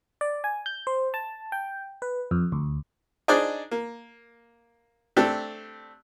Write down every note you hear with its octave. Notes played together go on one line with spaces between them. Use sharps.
D5
G#5
G6
C5
A5
G5
B4
F2
D2
D4 D#4 G#4 C5 D5 D#5
A#3
A3 C4 D4 G4 A4